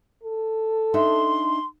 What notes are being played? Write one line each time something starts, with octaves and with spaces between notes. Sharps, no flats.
A4
D4 D#4 E5 C6